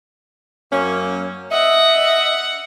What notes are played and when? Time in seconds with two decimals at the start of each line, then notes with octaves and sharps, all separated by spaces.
0.73 F#2 A#3 C#4
1.52 D#5 E5 F#5